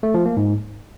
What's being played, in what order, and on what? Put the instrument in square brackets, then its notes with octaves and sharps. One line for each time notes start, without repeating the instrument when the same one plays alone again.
[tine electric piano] A3
F3
A#3
G#2